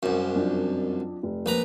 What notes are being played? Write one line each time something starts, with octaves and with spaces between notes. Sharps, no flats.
C2 F#2
F2 F#3 D4
F1
A#1 B4 A#5